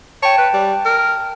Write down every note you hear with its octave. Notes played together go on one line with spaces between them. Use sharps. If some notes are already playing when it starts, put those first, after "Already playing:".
C#5 G5 A5
B4
G3
A#4